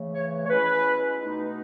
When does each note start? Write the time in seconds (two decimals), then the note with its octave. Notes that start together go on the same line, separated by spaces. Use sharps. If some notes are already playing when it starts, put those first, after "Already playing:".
Already playing: C#3 E3 A3
0.14 C#5
0.46 C#5
0.50 B2 G#3 C#4 E4 B4
1.22 B2 A3 D#4